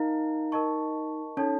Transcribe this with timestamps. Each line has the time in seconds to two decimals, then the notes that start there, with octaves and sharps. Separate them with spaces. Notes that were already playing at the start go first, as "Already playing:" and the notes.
Already playing: D#4 A#4 F5 A#5
0.52 A#4 D#5 A5 C#6
1.37 C#4 D#4 A4 C#5 A5